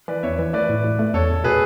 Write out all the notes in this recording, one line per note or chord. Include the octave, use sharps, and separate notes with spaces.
E3 B4 D5
E2 C#5 E5
E3
A3 B4 D5
A2
A2
A3
E2 A4 C#5
E2
B2 G#4 B4